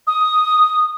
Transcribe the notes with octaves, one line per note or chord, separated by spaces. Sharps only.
D#6